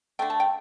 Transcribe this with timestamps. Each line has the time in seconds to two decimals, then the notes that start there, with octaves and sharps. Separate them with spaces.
0.19 D3 A3 G5
0.30 A5
0.40 G5